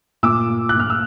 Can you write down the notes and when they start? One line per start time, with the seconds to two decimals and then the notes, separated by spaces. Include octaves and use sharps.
0.23 A#2 D6 E6
0.49 A#2
0.69 F#6
0.75 A#2 F6
0.90 E6